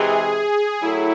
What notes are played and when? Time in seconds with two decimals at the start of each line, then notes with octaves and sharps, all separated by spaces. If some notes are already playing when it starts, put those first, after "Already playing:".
Already playing: C3 E3 G#3 G#4
0.82 A2 F#3 A3 E4